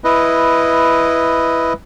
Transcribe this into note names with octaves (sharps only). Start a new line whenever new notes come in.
E4 B4 D#5